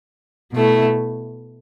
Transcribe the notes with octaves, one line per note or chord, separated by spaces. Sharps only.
B2 A3 E4